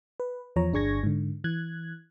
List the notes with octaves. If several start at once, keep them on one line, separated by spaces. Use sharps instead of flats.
B4
E2 F3 C#5 A#5
G1 D4 G#4 C#6 G#6 A#6
G#2 D3
E3 F#6 G#6